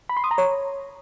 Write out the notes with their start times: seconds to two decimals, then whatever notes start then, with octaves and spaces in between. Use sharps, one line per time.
0.09 B5
0.17 C6
0.24 D#6
0.31 A#5
0.38 C#5